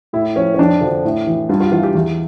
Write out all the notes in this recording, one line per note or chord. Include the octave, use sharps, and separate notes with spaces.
A2 E4
F3 C#4
C#4
F2 D4
D3 F3
A2
E3
G2 F4
F4
E3 F4
G4
E2